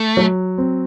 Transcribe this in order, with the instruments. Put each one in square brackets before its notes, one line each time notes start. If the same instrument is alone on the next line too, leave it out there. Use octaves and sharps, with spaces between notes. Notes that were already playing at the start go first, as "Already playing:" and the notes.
Already playing: [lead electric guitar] A3
[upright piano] F#3
C4